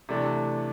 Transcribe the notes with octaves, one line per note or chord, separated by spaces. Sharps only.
C3 E3 A3 D4